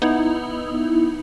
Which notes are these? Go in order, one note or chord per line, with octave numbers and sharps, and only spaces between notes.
B3 D#4 E4